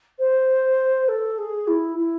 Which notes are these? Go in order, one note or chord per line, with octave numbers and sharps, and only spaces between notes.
C5
A4
G#4
E4
E4